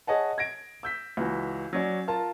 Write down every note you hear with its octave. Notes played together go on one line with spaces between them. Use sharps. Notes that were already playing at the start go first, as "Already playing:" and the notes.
G#4 C#5 D#5 F#5 A5
G#6 A#6 D7
E6 G6 B6
C#2 E3 F#4
F#3 C#4 D5
F4 A#4 A5